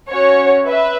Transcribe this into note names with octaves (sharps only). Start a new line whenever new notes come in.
C#4 F#4 C#5
B4 E5